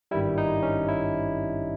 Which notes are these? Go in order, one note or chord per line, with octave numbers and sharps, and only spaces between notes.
G#1 G2 D#3 G3 E4
D#4
C#4
E4